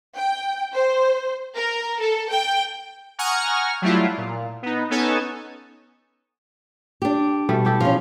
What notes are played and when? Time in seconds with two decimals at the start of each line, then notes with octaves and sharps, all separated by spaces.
0.16 G5
0.74 C5
1.56 A#4
2.00 A4
2.31 G5
3.19 F#5 G#5 A#5 C#6 D#6 F6
3.82 F#3 G3 A3 E4 F4
4.18 A#2
4.63 B3 D#4
4.90 B3 C#4 D#4 A4 C#5 G#5
7.02 D4 G4
7.49 B2 G3 A3
7.65 E4 G4 A4
7.80 F3 C#4